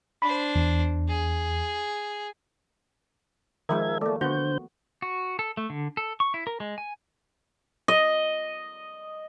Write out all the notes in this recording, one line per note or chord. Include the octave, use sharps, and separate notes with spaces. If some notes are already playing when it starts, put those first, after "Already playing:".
D4 C5 B5
E2
G#4
D#3 F3 G#3 A#4 E5 G#6
A3 A#3 A4 D5
D3 B3 F#4 C5 G6
F#4
A4
A3
D3
A4
C#6
E4
A#4
G#3
G#5
D#5